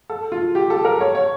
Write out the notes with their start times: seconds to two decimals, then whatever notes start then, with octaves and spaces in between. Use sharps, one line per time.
0.10 A4
0.32 F4
0.55 G4
0.70 A4
0.85 A#4
1.01 C#5
1.15 C#5